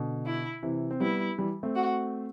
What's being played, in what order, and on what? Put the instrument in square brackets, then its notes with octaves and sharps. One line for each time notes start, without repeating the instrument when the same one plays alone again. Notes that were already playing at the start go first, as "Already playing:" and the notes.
Already playing: [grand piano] B2 D3
[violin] E4
[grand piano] C3 E3
C4
[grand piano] G3 B3 [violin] E4
[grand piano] E3 G3
A3 C4
[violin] F#4